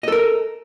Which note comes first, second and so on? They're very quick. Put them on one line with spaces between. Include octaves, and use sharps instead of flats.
D#5 A4 A#4